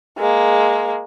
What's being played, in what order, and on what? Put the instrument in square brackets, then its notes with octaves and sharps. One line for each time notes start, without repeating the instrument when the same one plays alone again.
[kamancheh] G#3 A#3